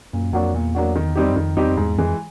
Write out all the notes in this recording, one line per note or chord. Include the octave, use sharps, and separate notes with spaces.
F#2 A#2
F2 F#3 A#3 D4 F#4
E2 A#2
F#3 A#3 D4 F#4
D#3
G3 C4 D#4 G4
F#2
F2 D#3
E2 G3 C4 D#4 G4
F2
E2 G#2
F2 E3 G#3